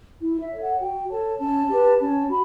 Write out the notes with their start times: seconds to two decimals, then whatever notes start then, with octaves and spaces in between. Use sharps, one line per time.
0.21 E4
0.40 E5
0.50 A4 C#5
0.60 F#5
0.80 F#4 G5
1.10 A4 C#5 A5
1.39 C#4 A5
1.69 G4 B4
1.99 C#4 A5
2.29 F#4 B5